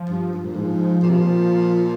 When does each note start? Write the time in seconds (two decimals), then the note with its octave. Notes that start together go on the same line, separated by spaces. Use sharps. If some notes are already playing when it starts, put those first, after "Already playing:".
Already playing: F3
0.09 G2
0.33 G2
0.44 A#2
0.56 G#2 F3
1.02 A#2
1.09 C3
1.16 A#2